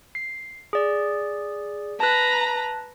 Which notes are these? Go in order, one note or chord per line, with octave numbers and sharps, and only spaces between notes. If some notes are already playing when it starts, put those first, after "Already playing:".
C7
G#4 D5
B4 A5 A#5 F#6